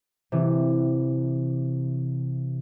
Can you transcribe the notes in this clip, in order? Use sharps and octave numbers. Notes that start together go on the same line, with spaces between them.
C3 E3